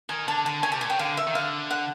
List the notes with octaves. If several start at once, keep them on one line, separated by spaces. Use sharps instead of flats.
D#3 G#5
D3 A5
D3 A5
C#3 G#5
C3 A5
A#2 G#5
C#3 G5
D3 F5
E5
D#3
D3 F5
F#5